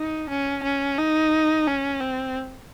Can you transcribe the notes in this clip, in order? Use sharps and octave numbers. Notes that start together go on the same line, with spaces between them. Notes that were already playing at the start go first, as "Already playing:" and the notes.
Already playing: D#4
C#4
C#4
D#4
C#4
C4